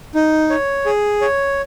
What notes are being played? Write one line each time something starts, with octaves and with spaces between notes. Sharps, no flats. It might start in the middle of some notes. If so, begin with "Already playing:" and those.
D#4
C#5
G#4
C#5